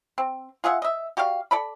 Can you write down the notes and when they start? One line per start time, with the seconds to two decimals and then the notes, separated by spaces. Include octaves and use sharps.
0.18 C4
0.64 F4 G#4 E5 F#5
0.82 D#5 E5
1.17 F#4 G4 D5 F5
1.51 A4 D5 B5